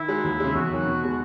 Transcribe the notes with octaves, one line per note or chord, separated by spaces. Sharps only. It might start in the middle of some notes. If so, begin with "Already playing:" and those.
Already playing: D#3 E4
G#3 D#4 F#4
D#2
C#3 G#3
E2 F#4
D#3 F#3
B2
G#3 B3